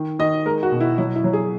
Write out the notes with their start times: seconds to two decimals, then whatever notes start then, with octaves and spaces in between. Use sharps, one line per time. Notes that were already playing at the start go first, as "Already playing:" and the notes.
Already playing: D#3
0.19 D#3 D#5
0.46 G#3 A#4
0.63 F#4
0.72 B2
0.81 E4
0.98 F#3 E4
1.16 E4
1.24 F#3
1.33 G#4